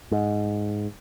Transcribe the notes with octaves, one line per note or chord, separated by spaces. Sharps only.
G#2